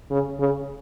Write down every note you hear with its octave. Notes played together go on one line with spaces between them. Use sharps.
C#3
C#3